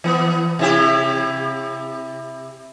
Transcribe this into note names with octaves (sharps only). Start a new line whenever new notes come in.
E3 B3
C3 E4 G4